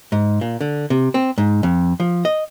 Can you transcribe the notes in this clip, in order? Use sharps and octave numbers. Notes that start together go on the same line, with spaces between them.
G#2
A#2
D3
C3
C4
G#2
F2
F3
D#5